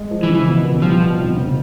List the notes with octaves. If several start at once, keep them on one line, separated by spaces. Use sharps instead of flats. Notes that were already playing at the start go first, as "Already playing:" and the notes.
Already playing: G#3
F3
E3
C#3
E3
B2
B3
F3 G3
B2
F1
C#3